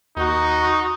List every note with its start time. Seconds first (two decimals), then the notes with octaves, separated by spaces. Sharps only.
0.17 D#2 D#4 F#4